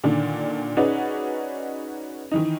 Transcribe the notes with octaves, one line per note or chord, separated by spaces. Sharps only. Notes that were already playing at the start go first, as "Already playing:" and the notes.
A#2 D3 D#3 D4
C#4 D#4 F#4 G#4 B4 D5
D#3 E3 D#4